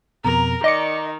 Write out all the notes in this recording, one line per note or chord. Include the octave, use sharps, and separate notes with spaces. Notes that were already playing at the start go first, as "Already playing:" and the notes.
F2 B2 A#4 A#5
D#3 D5 D#5 D6 C#7